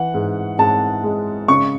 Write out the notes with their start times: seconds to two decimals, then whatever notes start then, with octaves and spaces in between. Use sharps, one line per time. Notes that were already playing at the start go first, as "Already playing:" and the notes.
Already playing: E3 F#5
0.14 G#2
0.59 G#2 A5
1.03 G#3
1.48 C#3 C#6